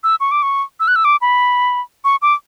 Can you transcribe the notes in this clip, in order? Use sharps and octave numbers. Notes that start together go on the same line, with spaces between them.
E6
C#6
D6
C#6
E6
F#6
E6
D6
B5
C#6
D6